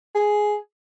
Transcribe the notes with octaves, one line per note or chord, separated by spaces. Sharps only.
G#4